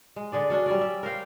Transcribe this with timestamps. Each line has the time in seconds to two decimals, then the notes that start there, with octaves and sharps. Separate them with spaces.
0.16 G#3
0.32 D3 G#4 D5
0.50 F#3 C#4 D4
0.66 G3 C#4 D5
0.81 E5
1.03 A#4 C5 F5 G5